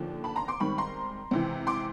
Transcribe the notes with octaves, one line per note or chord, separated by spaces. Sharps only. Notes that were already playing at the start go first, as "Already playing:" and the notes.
Already playing: D#2 D3 F3
A5 B5
A#5 C6
C6 D6
G#2 D#3 G3 C4 B5 C#6
A#5 C6
C#2 C3 E3
C6 D6